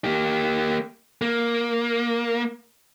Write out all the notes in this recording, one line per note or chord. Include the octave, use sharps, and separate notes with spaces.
A#3 G4
A#3